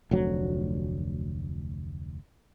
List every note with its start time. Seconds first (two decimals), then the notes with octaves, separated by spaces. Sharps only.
0.11 F1 D2 F#3